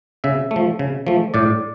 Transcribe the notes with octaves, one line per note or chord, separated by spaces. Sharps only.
C#3 E5
A3
F3
C#3
F3 A3
A2 D5